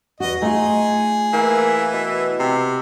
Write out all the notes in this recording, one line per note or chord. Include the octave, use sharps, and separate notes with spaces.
E2 F#4 D#5
A3 D#4 F4 G#4
E3 A#3
B2
C3